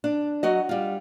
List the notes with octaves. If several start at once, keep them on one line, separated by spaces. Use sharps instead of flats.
D4
F#3 F#4 D#5
G3 F4